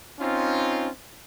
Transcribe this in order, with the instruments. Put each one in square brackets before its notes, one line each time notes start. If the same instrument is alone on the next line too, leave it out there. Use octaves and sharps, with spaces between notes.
[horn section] C4 C#4 D#4 F4